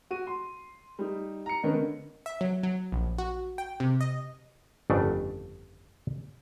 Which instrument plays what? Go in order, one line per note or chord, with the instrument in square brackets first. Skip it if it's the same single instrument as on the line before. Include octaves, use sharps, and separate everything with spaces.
[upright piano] F#4 D#7
C6
G3 D#4
A#5 C#7
D#3 C#4 D4 A#4 B4 D#5
D3
[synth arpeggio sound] E5
F#3
F#3
A#1
F#4
G5
C3
D#5
[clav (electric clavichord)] G1 F2 C#3 A3 D4